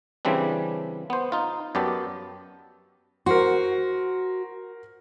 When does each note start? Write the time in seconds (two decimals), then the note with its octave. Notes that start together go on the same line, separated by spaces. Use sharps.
0.25 C#3 E3 G3 C4 D4
1.10 B3 C5
1.32 D#4 F4
1.75 F#2 B3 G4 D5 A5
3.26 F#4 A#4 C5 C6